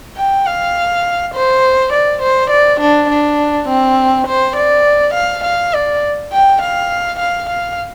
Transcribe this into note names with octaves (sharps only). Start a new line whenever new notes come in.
G5
F5
C5
D5
C5
D5
D4
D4
C4
C5
D5
F5
F5
D5
G5
F5
F5
F5